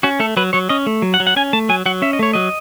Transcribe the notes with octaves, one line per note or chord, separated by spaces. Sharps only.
C#4 F#4
A3 A4
F#3 B4
F#3 C#5
C#4 D#5
A3
F#3
F#5
F#3
F#5
C#4 G#5
A3 A5
F#3 G#5
F#3 F#5
C#4 E5
D#5
A3 C#5
F#3 D#5